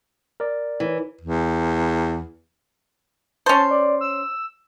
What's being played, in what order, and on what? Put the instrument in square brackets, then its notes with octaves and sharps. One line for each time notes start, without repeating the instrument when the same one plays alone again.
[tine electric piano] A#4 D5
[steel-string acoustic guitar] E3
[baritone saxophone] E2
[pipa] C#4 C5 [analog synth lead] A5
[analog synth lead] D5
E6